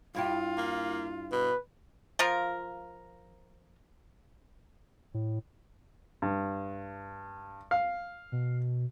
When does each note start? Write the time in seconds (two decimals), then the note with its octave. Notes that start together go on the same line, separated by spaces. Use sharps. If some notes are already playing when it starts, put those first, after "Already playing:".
0.15 G2 E4 F4 G4
0.58 A#3
1.32 B2 B4
2.19 F3 F4 A#4
5.14 A2
6.22 G2
7.71 F5
8.32 B2